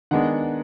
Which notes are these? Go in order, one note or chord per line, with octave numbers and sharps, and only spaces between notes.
D#3 G#3 B3 D4 F#5